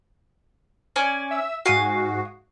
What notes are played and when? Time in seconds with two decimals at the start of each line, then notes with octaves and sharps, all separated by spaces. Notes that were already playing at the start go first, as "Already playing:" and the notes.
0.96 C#4 D5 G#5
1.31 E5 E6
1.66 G#2 F#4 F5 G#5 D#6